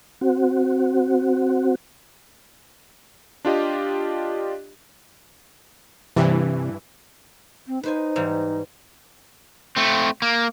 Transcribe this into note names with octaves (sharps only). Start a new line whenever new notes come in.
C4 F#4
D4 F4 G4 D#5
G2 C3 E3
C4
D#4 B4 C5 G#5
G#2 E3 G3
A3 C4
A#3